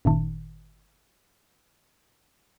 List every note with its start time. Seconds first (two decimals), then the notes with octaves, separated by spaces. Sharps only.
0.05 G1 A#2 D#3